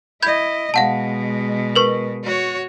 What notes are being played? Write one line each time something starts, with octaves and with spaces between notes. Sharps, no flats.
E4 D#5 B5 G6 G#6
B2 G#3 F5 F#5 A5
A#4 B4 C#6
F#4 C#5